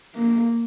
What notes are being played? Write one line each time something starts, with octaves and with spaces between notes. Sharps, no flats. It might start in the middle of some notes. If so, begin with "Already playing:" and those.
A#3